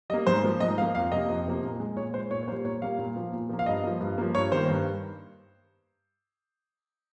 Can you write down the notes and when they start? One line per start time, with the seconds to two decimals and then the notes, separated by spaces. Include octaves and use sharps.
0.10 G3 D#5
0.13 A#3
0.27 G#2 C5
0.43 F3 A#3
0.60 G#2 D#5
0.78 F3 F5
0.82 A#3
0.95 F2 F5
1.12 C3 F3 A#3 D#5
1.29 F2
1.46 C3 F3 A#3
1.63 A#2
1.80 G#3
1.96 A#2 C#5
2.14 G#3 C5
2.31 A#2 C#5
2.43 C#5
2.48 A#3 C5
2.51 G3
2.65 A#2 C#5
2.82 G3 A#3 F5
2.99 A#2
3.16 F3 A#3
3.33 A#2
3.49 F3 A#3
3.59 F5
3.66 G2 D#5
3.83 F3 A#3
4.01 G2
4.18 F3 A#3
4.34 G2 C#5
4.52 D#3 A#3 C5
4.68 G2